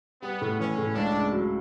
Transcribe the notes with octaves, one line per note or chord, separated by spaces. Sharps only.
G3 B3
A2
E3 C#4
A2
C#2 D4
C#3
F#3